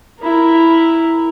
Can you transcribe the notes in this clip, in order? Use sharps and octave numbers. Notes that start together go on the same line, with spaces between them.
E4 A#4